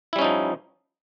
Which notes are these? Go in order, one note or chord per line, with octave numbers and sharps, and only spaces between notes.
F3 G3 C#4 D#4 E4